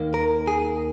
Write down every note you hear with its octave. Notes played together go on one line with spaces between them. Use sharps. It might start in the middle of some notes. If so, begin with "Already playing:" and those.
Already playing: D#2 D#3 A#3
A#4
G#4